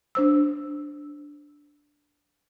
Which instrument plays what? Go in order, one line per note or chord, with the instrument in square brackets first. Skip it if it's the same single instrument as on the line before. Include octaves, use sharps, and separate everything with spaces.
[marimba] D4 C5 E6